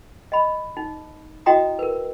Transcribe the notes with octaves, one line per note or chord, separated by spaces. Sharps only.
D#5 B5
D#4
E4 F#4 D#5 G5 A#5 D#6
A#4 B4